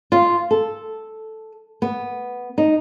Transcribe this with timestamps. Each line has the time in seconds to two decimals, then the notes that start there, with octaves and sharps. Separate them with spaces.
0.12 F4
0.51 A4
1.82 B3
2.58 D#4